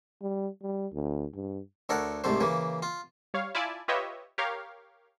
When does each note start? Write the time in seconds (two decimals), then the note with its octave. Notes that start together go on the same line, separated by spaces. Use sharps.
0.22 G3
0.62 G3
0.93 D2
1.34 G2
1.89 D2 A4 A#4 C#5 F#5
2.24 C2 G#2 C3 A3 C5
2.40 C#3 E3 A#3
2.82 F4
3.34 G3 C#5 F5
3.55 E4 F4 D5 G#5 A5
3.88 F4 G4 B4 C#5 D#5 E5
4.38 G4 A#4 C#5 F5